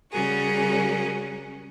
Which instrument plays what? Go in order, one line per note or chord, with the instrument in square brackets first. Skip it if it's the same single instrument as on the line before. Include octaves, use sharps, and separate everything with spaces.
[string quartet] C#3 G3 C#4 F#4 G#4 A#4